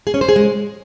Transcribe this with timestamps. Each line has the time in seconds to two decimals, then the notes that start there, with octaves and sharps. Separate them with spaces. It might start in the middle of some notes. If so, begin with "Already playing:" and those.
0.07 G#4
0.14 C#4
0.21 C5
0.29 G#4
0.36 G#3